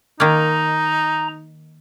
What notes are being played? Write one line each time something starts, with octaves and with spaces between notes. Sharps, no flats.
D#3 A#3 D#4 A#5